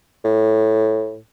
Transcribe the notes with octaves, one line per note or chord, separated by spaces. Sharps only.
A2